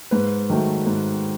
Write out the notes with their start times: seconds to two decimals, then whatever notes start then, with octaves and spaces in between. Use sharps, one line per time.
0.11 G#2 B4
0.50 D#3 F#3 A3
0.86 G#2